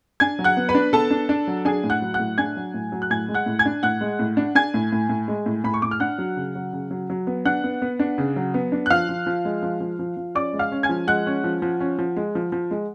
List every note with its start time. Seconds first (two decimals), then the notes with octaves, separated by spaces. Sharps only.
0.20 D4 G#5 G#6
0.39 F#3
0.44 F#5 F#6
0.57 B3
0.69 B4 B5
0.75 D4
0.93 B3 A4 A5
1.11 D4
1.29 D4
1.48 F#3
1.65 D4 G#4 G#5
1.84 A2
1.90 F#5 F#6
2.02 F#3
2.14 F#5 F#6
2.19 A2
2.38 D4 G#5 G#6
2.57 F#3
2.74 A2
2.92 F#3
3.02 F#6
3.10 A2 G#5 G#6
3.29 G#3
3.34 F#5 F#6
3.46 A2
3.59 G#5 G#6
3.65 D4
3.83 A2 F#5 F#6
4.01 G#3
4.19 A2
4.37 D4
4.55 D4 G#5 G#6
4.74 A2
4.92 A2
5.09 A2
5.28 G#3
5.46 A2
5.64 A2 B5
5.74 C#6
5.82 A2 D6
5.91 F6
6.00 D4 F#5 F#6
6.18 F#3
6.37 C#3
6.55 F#3
6.73 C#3
6.91 F#3
7.10 F#3
7.27 B3
7.45 D4 F#5 F#6
7.64 B3
7.82 B3
7.99 D4
8.18 C#3
8.36 F#3
8.54 B3
8.72 D4
8.86 F#6
8.90 F3 F5 F6
9.09 F3
9.26 F3
9.45 G#3
9.63 F3
9.80 F3
9.99 F3
10.17 F3
10.35 C#4 D5 D6
10.53 G#3
10.59 F5 F6
10.72 C#4
10.83 G#5 G#6
10.89 F3
11.08 G#3 F#5 F#6
11.27 C#4
11.44 F3
11.62 F3
11.80 C#4
11.99 F3
12.16 G#3
12.35 F3
12.52 F3
12.71 G#3